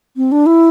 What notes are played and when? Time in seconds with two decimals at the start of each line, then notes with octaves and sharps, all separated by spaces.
0.17 C4
0.32 D4
0.46 E4